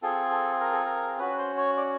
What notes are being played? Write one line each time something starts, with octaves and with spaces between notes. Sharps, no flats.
C4 F4 G#4 A4
A4
A#4
A4
A#4
C#4 F#4 B4
C5
C#5
D5